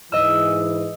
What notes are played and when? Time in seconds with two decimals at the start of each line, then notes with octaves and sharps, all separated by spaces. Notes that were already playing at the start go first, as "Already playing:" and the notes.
0.12 G#2 E3 D#5 E6